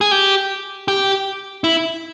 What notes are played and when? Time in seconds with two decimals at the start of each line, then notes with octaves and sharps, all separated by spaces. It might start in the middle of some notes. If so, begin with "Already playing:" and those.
0.01 G#4
0.11 G4
0.88 G4
1.64 E4